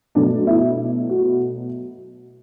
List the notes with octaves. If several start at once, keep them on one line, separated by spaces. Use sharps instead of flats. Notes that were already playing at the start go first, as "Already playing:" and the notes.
B2 F#3 A3 D4
E4
F#4